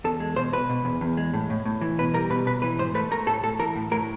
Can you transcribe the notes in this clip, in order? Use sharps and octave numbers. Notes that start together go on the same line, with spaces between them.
E2 A4
G#3
B2 C5
B2 B4
B2
E2
E2
G#3
A2
A2
A2
E3
B2 B4
G3 A#4
B2 B4
B2 B4
E3 B4
G#2 C5
A3 B4
A3 A#4
A2 A4
A2 A4
E3 A#4
A2
A2 A#4